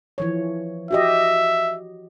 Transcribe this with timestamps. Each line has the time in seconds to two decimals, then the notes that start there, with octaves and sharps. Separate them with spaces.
0.18 E3 F3 C#5
0.91 F#4 G4 D#5 E5